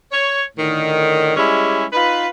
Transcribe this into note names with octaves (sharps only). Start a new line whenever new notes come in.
C#5
A2 D3 D#3
G3 G#3 C#4 E4
D#4 F4 B4